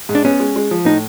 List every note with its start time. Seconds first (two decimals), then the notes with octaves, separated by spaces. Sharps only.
0.09 G#2
0.15 D4
0.25 B3 C#4
0.40 G#3
0.56 G#3
0.71 F3
0.86 A2 D#4